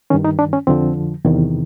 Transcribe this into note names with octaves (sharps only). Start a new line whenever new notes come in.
G2 D#3 C#4
D#4
D4
C#4
F2 D3 F3 C4
E2 C3 D#3